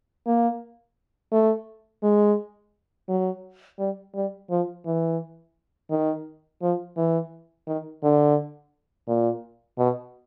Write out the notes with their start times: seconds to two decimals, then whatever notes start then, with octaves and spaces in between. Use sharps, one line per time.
0.26 A#3
1.32 A3
2.03 G#3
3.08 F#3
3.79 G3
4.15 G3
4.50 F3
4.85 E3
5.90 D#3
6.62 F3
6.97 E3
7.67 D#3
8.03 D3
9.08 A#2
9.78 B2